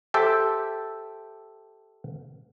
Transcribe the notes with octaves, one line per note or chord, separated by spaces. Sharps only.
G4 A4 C5 E5 G5